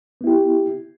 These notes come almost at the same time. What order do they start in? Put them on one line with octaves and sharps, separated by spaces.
B3 E4 G4